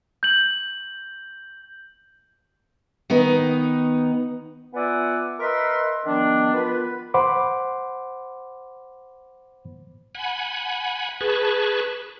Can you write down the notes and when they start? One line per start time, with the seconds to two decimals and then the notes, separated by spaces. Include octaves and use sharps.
0.23 G6 F#7
3.10 D#3 B3 D#4
4.74 B3 F4 D5 E5 F#5 G#5
5.39 A#4 B4 D#5 E5 B5 C6
6.05 D#3 F3 B3 D4
6.53 B3 F4 A#4 B4
7.14 C5 F#5 B5 C6 D6
10.15 F#5 G#5 B5
11.21 G#4 B4 A5 B5 C#6